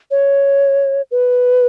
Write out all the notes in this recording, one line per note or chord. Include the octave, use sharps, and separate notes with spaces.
C#5
B4